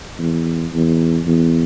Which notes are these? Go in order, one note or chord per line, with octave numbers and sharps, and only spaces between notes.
E2
E2
E2